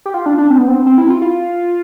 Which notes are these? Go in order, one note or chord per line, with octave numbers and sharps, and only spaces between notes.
G4
F4
D4
D4
C4
B3
C4
C4
E4
F4
F4